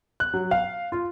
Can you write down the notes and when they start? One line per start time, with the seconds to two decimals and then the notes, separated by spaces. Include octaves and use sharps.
0.20 F#6
0.34 F#3
0.51 F5
0.92 F4